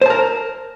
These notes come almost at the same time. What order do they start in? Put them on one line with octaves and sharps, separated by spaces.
C5 A5 A#4